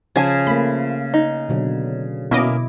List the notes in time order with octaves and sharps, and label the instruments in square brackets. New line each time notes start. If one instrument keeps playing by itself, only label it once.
[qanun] C#3 [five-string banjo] F3 G#5 A5 [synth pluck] G#6
[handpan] A3 A#3 [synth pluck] B5
[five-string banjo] D#4
[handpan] B2 D3 F#3
[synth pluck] B2 D#5 D6 [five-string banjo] A#3 C#4 [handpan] E4